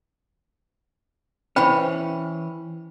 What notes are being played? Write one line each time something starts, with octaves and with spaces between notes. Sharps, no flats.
E3 C#4 C5 G5 B5